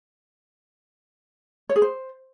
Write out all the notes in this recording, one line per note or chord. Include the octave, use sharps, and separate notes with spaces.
C#5
G#4
C5